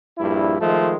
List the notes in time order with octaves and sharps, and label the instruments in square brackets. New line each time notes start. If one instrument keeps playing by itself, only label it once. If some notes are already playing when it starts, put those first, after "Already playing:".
[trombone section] A#1 G2 E4
D#3 F3 G#3 A3